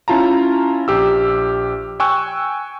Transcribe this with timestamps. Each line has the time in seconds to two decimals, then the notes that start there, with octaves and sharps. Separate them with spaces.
0.08 C#4 E4 F4 A5 A#5
0.88 A#1 G4 E6
2.00 G5 G#5 C#6 E6 F#6